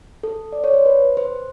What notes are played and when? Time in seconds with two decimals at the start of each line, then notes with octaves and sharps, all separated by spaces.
0.23 A4
0.53 D5
0.64 C#5
0.74 C5
0.86 B4
1.17 C5